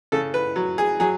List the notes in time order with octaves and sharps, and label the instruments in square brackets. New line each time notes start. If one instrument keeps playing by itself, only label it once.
[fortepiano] C#3 A4
B4
F#3
G#4
F#3 G#4